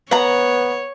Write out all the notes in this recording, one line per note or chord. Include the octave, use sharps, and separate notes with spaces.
B3 C#5 F#5 A#5